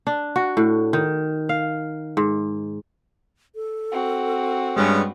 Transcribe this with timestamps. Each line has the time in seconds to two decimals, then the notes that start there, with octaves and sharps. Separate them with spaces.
0.07 D4
0.36 F#4
0.57 A2
0.93 D#3
1.49 F5
2.17 G#2
3.55 A4
3.92 C4 F#4
4.76 G2 G3 G#3 B3 C#4